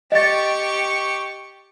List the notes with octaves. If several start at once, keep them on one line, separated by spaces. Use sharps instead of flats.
G4 D#5 C#6 A6